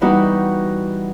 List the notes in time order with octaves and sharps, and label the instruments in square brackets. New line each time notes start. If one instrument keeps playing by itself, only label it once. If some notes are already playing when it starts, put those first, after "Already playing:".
[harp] E3 G3 B3 D#4 E4 F#4